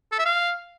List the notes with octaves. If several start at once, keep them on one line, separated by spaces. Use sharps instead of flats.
A4
E5
F5